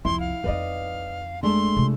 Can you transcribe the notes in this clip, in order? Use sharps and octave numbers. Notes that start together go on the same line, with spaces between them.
C2 F2 E4 C6
F5
F2 D#4 B4 D5 D#5
G#3 A3 D4 C6
C3 F4